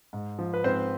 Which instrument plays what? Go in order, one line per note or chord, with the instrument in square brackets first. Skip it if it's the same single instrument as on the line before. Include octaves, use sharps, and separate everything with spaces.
[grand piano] G#2
F3
B4
G#2 C4 C5